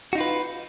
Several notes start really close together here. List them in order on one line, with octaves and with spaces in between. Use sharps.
F#4 D#4 F4 B4